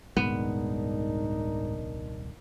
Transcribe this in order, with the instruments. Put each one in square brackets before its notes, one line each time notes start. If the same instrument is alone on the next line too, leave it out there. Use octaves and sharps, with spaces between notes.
[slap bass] D#1 C2 [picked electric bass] G#2 [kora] B3 [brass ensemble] D4 D#4 A#4